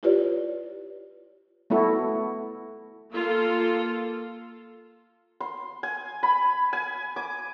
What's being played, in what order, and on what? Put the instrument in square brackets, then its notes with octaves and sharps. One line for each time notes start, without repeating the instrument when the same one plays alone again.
[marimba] E4 F4 G4 B4 C#5 D5
[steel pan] A3 B3 E4 F#4 A4
[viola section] A#3 F4 A4
[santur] C6
G#5
B5
G#5
D6